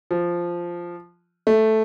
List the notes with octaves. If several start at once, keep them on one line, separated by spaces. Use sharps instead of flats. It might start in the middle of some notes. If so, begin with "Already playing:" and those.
F3
A3